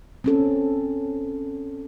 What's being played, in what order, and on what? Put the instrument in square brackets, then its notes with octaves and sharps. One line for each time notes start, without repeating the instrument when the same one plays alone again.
[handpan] C4 C#4 A4